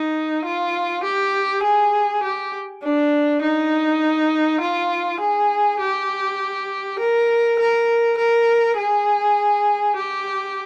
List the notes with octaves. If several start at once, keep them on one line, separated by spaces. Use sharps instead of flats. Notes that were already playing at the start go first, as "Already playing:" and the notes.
Already playing: D#4
F4
G4
G#4
G4
D4
D#4
F4
G#4
G4
A#4
A#4
A#4
G#4
G4